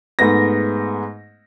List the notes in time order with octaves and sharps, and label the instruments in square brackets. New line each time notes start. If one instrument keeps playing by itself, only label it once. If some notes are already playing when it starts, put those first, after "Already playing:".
[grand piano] G#2 A3 B3 A#6